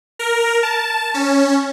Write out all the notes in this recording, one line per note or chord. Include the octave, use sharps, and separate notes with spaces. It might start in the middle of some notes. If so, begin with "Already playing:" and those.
A#4
A5
C#4